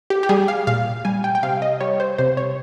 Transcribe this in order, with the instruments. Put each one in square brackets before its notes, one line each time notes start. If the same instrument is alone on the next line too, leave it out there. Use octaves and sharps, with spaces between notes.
[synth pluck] G4
G4
G3 G#4
F5
A#2 F5
G3 G#5
G5
G5
C3 F5
D#5
G3 C#5
C5
C3 C5
C#5